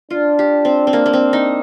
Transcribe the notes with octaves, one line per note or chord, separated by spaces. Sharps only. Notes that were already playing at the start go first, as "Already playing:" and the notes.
D4 F4
G4
C4
C4
A#3
A#3
C4
D#4